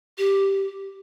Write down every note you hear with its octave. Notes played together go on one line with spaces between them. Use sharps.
G4